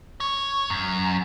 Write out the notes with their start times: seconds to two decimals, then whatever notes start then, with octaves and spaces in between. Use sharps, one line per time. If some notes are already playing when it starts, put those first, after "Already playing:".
0.20 C#5
0.70 F#2